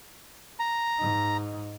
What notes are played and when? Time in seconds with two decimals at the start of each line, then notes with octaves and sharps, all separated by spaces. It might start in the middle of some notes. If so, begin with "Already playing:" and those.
0.59 A#5
0.99 G#2 D#4